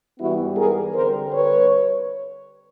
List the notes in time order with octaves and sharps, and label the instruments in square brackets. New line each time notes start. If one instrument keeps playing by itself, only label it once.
[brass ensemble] G#2 E3 G3 B3 E4 F#4
G#4 A#4
D3 G3 C4 A#4 C5
B4 C#5